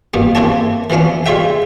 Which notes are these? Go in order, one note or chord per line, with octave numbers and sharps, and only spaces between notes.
G2 B2 A#3 B3
A#3 C4 E4 G4 C#5 A5
E3 F3 B3 C#4 D4
G3 G#3 F4 C#5 E5 G5